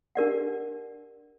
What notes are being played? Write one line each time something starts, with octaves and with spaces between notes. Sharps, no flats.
D4 G4 A#4 D5 F#5